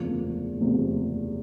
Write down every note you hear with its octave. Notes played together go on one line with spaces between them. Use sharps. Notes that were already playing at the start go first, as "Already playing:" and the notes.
Already playing: F#1 E2 C3 F3 A3
F#1 E2 C3 F3 A3